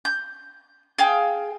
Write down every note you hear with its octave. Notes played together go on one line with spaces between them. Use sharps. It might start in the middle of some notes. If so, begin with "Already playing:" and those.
G6
G#4 F5 G5